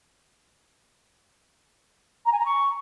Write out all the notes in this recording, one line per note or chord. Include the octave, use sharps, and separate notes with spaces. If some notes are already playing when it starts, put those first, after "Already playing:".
A#5
G#5
A#5
C#6